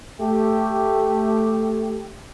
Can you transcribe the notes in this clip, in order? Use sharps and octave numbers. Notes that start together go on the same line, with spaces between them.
A3 G4